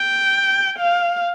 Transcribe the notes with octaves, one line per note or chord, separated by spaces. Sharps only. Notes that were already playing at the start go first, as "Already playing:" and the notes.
Already playing: G5
F5